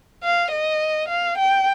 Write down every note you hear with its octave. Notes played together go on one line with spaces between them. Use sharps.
F5
D#5
F5
G5